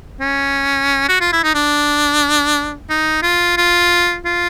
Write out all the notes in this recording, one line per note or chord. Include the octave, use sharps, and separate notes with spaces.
C#4
F#4
F4
E4
D#4
D4
D#4
F4
F4
F4